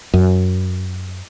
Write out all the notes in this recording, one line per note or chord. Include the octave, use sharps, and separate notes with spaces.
F#2